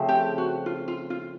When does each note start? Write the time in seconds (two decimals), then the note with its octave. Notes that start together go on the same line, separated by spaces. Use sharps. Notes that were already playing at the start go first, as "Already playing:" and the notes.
Already playing: C#3 F3 A3 C4
0.09 G4
0.38 F#4
0.66 F4
0.88 F4
1.10 F4